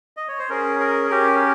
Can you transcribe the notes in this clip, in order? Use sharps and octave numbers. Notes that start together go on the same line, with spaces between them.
D#5
C#5
C5
C#4 G#4 A#4
A#4
C#4 G4 A#4